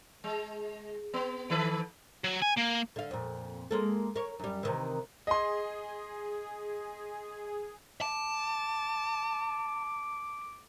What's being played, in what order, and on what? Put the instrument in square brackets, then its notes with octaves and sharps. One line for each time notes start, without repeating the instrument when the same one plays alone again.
[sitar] G#3
B3
D#3 A4 B4
[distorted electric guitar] F#3
G#5
A#3
[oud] D3 F5
F2 A#2
G#3 A#3 A4
A#4 C#5
F#2 G3
C3 D#3 E3
[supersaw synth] G#4 [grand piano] D#5 C6
[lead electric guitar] A5 [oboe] D6